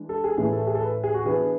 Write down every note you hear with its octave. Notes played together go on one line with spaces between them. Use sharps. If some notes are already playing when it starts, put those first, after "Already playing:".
Already playing: E3 G#3 D4
A4
G#4
A2 E3 A3 G#4
A4
G#4
A4
B4
G#4
F#4
E3 B3 D4 G#4